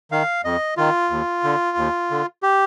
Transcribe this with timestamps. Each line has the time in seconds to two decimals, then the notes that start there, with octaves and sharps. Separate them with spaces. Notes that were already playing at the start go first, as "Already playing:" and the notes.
0.11 D#3 F5
0.44 F2 D#5
0.77 D#3 F4
1.10 D#2
1.44 D3
1.77 D#2
2.11 D3
2.43 G4